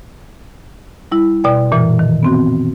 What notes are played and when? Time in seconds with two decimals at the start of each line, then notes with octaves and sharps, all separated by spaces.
1.11 G3 E4
1.44 B2 D5 G5
1.71 F#2 A#2 E3
1.99 D#3
2.23 B3 C4 F#4